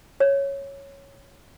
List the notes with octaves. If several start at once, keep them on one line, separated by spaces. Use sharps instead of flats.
C#5